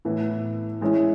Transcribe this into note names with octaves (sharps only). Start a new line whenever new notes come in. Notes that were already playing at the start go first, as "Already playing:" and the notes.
A2 E3 B3 E4
E3 G#3 C#4 E4